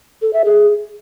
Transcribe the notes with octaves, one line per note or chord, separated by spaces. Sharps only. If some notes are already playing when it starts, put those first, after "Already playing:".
A4
E5
G#4